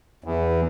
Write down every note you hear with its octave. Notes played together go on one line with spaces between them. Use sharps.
E2